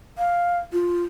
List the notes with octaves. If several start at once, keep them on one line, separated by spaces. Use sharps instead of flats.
F5
F4